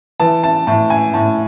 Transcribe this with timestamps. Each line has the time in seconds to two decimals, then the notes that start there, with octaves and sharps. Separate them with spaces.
0.20 E3 A5
0.44 A5
0.67 A2 A5
0.90 G#5
1.14 A2 A5